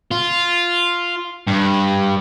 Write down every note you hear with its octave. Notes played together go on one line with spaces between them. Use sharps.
F4
G2